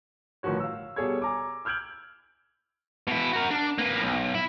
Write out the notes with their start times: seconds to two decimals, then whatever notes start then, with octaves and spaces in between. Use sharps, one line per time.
0.43 G1 A2 D#3 F3 F#4 C#5
0.60 F5 E6
0.96 B2 G3 G#4 A4 C#5 G#6
1.22 G#5 A#5 D6
1.65 E6 F6 G6 G#6 D7 F#7
3.07 B2 E4
3.33 F#4 A#4
3.50 D4
3.78 A#3 B4
4.02 B1
4.34 E4